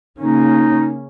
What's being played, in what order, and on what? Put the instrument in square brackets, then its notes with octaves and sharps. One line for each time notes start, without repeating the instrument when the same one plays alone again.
[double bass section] C#3 A#3 C#4 [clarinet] D#4